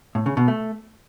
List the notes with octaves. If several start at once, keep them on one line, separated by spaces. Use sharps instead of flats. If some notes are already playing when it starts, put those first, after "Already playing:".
A2
C#3
B2
A3